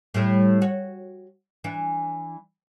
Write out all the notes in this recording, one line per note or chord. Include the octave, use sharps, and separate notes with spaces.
A2 G3 A3
F#4 C#5
E3 D4